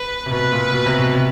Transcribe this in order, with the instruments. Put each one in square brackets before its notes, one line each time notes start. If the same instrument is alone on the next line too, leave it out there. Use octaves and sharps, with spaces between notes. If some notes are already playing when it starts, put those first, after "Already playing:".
Already playing: [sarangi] B4
[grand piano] C3
[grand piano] B2 [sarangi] B4
[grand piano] A#2
B2
C3
B2
C3